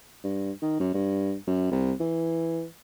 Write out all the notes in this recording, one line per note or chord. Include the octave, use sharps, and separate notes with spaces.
G2
D#3
F#2
G2
F#2
C2
E3